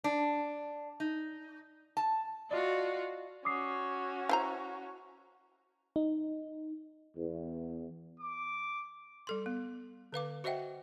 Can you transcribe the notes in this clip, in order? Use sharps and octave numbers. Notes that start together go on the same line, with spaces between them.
D4
D#4
A5
F4 F#4 D5 D#5
C#4 F#4 D6 D#6 C7
E4 C5 A#5
D#4
E2
D6
G3 A4 C6
B3
D3 B4 F5 D6
F#4 C5 D#5 E5 F#5 G5